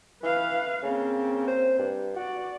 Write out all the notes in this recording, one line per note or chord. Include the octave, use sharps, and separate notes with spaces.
E3 B4 F5
C#3 A#3 C4
C5
G2
F#4 D5